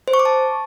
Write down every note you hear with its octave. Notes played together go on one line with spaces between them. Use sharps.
C5
C#6
D6
A5